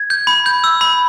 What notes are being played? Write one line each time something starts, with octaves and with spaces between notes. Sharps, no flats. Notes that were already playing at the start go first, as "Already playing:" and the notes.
Already playing: G#6
G6
B5
G6
E6
B5